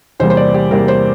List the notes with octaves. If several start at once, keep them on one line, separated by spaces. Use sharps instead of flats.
E2 C3 G3 A#3 C5
C5
D5
G4
E2 C3 G3 A#3 A#4
C5